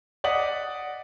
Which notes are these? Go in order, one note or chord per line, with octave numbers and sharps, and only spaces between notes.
D5 D#5 F#5 D#6 B6 F#7